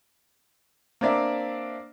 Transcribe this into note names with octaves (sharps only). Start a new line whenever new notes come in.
A#3 C4 D4 D5 E5